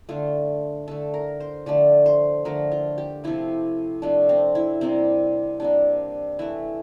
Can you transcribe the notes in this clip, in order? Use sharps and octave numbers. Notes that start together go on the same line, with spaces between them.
D3 A3 F4
D3 A3 A4
A#4
C5
D3 F3 A3 D5
C5
D3 F3 A3 A#4
F4
G4
C3 F3 A3 E4
C3 F3 A3 D4
C4
E4
C3 G3 A#3 C4
C3 G3 A#3 D4
E3 A3 E4